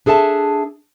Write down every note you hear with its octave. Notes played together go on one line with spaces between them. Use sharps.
D4 G#4 A4 E5 A5